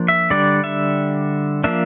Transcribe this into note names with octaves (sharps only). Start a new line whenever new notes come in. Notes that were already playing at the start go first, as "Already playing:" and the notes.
Already playing: F3 A#3 D4
E5
D3 G3 D4 D5
E5
F3 A#3 D4 E5